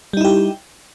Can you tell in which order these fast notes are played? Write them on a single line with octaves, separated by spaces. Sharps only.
G3 D#4 E4 G4